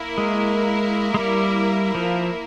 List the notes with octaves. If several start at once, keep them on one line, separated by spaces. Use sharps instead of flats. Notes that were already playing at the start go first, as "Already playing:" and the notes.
Already playing: A#3 E4 A#4
G#3
G#3
G3
F3